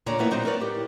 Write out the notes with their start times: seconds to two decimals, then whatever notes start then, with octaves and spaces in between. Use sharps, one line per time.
0.06 D#2 A#2 D3 C#5 D5 A#5
0.19 F2 A2 A#3 B3 E4 E5
0.31 A#2 F#3 C4 D#4 A#5
0.45 A#4 B4 C#5 D5
0.60 A2 G4